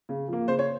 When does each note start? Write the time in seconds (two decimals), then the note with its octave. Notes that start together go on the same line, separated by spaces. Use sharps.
0.09 C#3
0.28 F3 A#3
0.48 C#3 C5
0.59 C#5